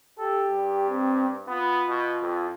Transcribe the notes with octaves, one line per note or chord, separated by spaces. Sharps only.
G4 A4
G2
C4
B3 F4
B2
F2